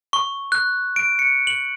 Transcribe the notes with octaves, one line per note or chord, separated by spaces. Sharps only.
C#6
F#6
D7
C#7
F#7